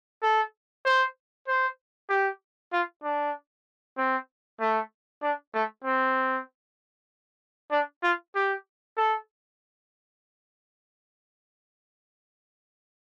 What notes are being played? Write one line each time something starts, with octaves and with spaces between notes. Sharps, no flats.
A4
C5
C5
G4
F4
D4
C4
A3
D4
A3
C4
D4
F4
G4
A4